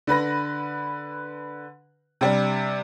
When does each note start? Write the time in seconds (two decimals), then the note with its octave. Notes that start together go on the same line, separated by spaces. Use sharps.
0.07 D3 B4 B5 A#6
2.21 C3 G3 D4